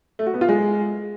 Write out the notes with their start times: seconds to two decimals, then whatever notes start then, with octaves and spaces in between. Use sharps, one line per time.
0.19 A3
0.26 F#4
0.34 B3
0.41 F4
0.49 G#3